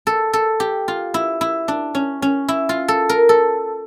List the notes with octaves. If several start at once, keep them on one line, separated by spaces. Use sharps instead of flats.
A4
A4
G4
F4
E4
E4
D4
C#4
C#4
E4
F4
A4
A#4
A4